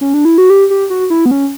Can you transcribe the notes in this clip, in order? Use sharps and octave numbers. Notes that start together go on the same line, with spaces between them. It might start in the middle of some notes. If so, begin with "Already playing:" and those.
C#4
D4
E4
F#4
G4
G4
F#4
E4
B3
C#4